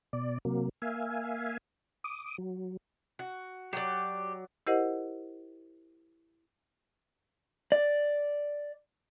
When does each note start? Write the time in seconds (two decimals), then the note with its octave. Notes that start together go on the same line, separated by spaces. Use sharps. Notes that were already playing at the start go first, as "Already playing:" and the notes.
0.13 B2 D5
0.45 C3 F#3 A#3
0.82 A#3 E5 F5 G#5
2.04 D6 D#6
2.38 F#3
3.19 F#4
3.73 F#3 G4 D5
4.67 E4 G4 A#4 C5 D#5 F#5
7.72 D5